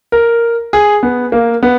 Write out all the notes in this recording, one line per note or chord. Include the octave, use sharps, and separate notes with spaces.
A#4
G#4
B3
A#3
B3